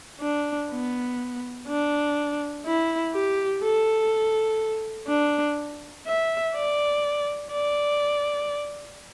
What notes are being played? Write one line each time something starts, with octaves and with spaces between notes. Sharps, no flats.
D4
B3
D4
E4
G4
A4
D4
E5
D5
D5